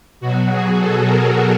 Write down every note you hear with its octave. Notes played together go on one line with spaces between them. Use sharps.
B2 F#3 F#4
G#4
A4
A#4